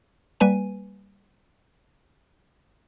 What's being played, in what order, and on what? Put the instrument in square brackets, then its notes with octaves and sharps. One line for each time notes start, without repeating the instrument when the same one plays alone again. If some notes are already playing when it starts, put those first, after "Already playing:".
[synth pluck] G3 A#3 B4 G#5 D#7